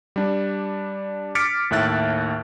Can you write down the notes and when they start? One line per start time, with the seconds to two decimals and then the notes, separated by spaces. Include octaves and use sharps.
0.16 G3 D4
1.35 D6 F6 A6 B6 C#7 D7
1.71 D#2 A2 E5 F#6 A6